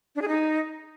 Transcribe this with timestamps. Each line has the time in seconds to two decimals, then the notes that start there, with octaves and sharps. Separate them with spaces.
0.16 D4
0.22 G#4
0.28 D#4